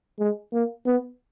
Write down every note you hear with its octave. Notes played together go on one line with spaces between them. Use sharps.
G#3
A#3
B3